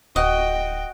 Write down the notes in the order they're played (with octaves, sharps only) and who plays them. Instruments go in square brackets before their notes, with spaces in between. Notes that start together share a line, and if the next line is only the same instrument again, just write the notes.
[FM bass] D1 [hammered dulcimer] F#4 [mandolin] D#5 [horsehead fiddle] G5